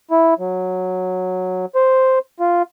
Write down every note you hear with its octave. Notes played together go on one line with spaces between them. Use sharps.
E4
F#3
C5
F4